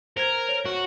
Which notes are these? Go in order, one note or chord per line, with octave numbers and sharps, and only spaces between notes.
A#4 C5 G#6
C#5 D7
F#4